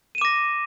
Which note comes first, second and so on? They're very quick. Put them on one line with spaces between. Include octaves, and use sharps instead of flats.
D#7 E7 D6 A#6